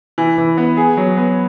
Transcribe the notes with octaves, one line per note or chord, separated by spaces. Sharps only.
E3
E3
B3
G#4
F#3
B3